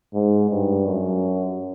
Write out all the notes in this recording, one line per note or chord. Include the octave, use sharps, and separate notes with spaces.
G#2
G2
F#2